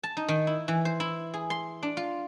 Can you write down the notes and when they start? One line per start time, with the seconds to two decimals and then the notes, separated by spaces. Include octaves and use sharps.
0.03 A5
0.17 D#4
0.28 D#3
0.47 E4
0.68 E3
0.85 C5
1.00 E4
1.34 G#4
1.50 C6
1.83 D4
1.97 F4